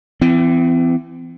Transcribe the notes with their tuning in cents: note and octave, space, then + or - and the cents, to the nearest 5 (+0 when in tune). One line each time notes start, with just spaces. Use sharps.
E3 +30 C4 -35